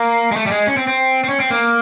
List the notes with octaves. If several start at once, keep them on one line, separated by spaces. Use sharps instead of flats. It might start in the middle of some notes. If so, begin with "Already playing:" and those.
Already playing: A#3
G#3
A3
G3
G#3
C#4
C4
C4
C4
C#4
C4
A#3